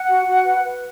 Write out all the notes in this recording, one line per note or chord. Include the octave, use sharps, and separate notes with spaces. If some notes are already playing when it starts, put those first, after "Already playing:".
Already playing: F#5
F#4
F#4
B4
B4